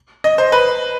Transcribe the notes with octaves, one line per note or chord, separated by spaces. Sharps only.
D#5
C5
B4